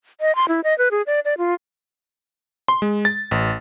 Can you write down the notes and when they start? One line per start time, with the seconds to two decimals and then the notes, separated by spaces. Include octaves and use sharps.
0.21 D#5
0.35 C6
0.48 E4
0.64 D#5
0.78 B4
0.91 G#4
1.07 D5
1.25 D5
1.38 F4
2.68 C6
2.82 G#3
3.05 A6
3.31 A1